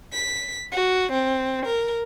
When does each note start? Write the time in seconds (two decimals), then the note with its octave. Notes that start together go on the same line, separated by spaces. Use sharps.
0.12 B6
0.71 F#4
1.12 C4
1.65 A#4